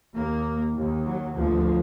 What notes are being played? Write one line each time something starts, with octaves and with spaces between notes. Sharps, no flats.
D#2 A#3
D#2
F#3
D2 F3